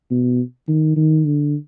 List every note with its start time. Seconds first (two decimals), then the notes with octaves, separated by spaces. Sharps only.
0.11 B2
0.68 D#3
0.96 D#3
1.25 D3